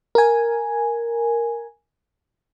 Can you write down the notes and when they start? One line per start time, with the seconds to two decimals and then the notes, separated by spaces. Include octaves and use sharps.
0.15 A#4 G#5